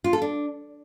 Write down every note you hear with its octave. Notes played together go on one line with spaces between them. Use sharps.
F4
A4
D4